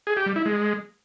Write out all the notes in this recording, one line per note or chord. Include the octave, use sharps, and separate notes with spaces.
G#4
G4
G3
E4
G#3